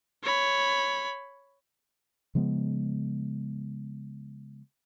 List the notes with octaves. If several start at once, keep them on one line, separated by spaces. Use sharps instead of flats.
C#5 B5
C#3 F3 G#3 B3